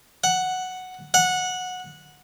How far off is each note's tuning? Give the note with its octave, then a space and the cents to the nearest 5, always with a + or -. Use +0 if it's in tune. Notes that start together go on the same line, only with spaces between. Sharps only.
F#5 +0
F#5 -15